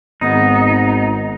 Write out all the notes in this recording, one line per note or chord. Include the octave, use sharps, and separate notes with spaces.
G#1 B3 D#4